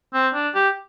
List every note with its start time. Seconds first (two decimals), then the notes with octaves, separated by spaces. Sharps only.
0.14 C4
0.34 D4
0.55 G4